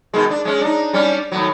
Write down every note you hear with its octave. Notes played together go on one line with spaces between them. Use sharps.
B2 D#3 G#3
D4
G#3 C#4
D4 D#4
G3 C#4 D4
D#2 A2 F#3